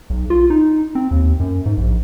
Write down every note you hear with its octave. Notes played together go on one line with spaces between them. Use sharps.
B1
F4
D#4
C4
D#2
F#2
G#2
A#1